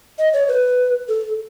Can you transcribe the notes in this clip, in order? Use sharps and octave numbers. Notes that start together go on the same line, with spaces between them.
D#5
C#5
B4
A4